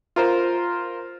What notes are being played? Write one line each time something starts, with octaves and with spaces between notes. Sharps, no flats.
F4 A#4 C5